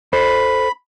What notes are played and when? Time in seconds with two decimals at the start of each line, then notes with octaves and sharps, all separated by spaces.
0.13 A4 C5 B5